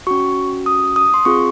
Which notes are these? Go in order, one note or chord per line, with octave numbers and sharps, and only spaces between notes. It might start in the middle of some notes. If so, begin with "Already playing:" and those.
C#4 F#4 C#6
D#6
D#6
C6
C4 F4 G#4 C#6